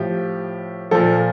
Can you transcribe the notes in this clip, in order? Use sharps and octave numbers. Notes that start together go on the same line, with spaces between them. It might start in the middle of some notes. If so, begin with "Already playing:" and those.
Already playing: A2 F3 G4
A#2 F3 A4